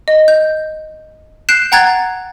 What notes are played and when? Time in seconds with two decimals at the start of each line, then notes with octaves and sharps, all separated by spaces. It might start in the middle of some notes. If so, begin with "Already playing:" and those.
0.08 D#5
0.28 G6
1.49 F#6 G6 C7 D7 E7
1.72 F#5 G5 A#5 F#6 G#6 A6